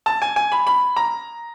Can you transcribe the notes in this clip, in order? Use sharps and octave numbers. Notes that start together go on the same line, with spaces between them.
A5
G#5
G#5
B5
B5
A#5